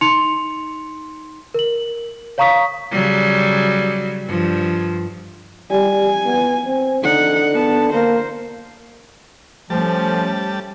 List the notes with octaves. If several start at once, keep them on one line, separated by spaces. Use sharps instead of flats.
D#4 C6 C#7 F7
A#4 F#7
C#5 F5 A#5 C#6 D#6 B6
C#3 F#3 G3
G2 F3
G3 G#5
B3
C4
D3 D#4 F#5
B3 A5
A#3 A#4 C5
F3 G3 A3 C#4 A5